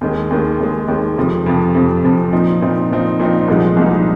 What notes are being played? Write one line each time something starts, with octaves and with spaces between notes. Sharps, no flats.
D#2 D#3 G#3
D#2 D#3 G#3
D#2 D#3 G#3
D#2 D#3 G#3
F2 C3 F3
F2 C3 F3
F2 C3 F3
F2 C3 F3
A#2 F3 C4 D#4
A#2 F3 C4 D#4
A#2 F3 C4 D#4
A#2 F3 C4 D#4
C2 A#2 F3 G#3 D#4
C2 A#2 F3 G#3 D#4